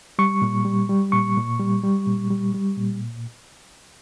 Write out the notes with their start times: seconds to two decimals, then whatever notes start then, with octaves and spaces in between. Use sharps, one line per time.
0.19 G3 C#6
0.42 A#2
0.65 G3
0.89 G3
1.12 A#2 C#6
1.37 A#2
1.59 G3
1.83 G3
2.07 A#2
2.30 G3
2.54 G3
2.77 A#2